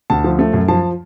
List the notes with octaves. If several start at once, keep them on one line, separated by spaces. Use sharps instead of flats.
D2 A5
F3
A3
F#2
F3 A5